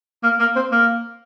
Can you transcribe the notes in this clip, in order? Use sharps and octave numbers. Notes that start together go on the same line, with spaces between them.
A#3
A#3
C4
A#3